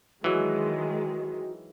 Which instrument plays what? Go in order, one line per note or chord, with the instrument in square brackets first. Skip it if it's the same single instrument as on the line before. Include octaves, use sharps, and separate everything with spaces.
[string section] D#3 G#3 [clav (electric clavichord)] E3 F#3 [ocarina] F#4